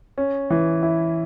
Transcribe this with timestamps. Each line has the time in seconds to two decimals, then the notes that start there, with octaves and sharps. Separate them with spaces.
0.18 C#4
0.50 E3
0.83 E4